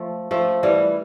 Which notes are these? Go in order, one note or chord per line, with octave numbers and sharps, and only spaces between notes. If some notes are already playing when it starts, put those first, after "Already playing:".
Already playing: F3 A3
F3 A3
E3 G3